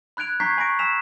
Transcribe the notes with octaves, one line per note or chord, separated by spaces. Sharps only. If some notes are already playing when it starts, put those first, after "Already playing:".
B5 F#6 G#6 D7 F7
A#5 C#6 G6 G#6 B6 C7
G#5 B5 C#6 A#6 D7
G#5 E6 B6 E7 F7